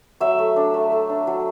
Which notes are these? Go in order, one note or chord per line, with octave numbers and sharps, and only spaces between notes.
F#3 E5
A3
D4
A3
A3
D4
F#3